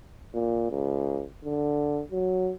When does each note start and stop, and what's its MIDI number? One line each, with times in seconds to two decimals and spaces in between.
0.34 0.69 46
0.71 1.23 37
1.44 2.03 50
2.11 2.52 54